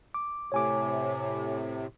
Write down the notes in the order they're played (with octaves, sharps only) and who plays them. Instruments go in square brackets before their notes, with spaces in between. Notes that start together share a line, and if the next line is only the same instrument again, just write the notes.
[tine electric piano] D6
[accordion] A2 C3 [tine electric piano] C#5 G#5 D6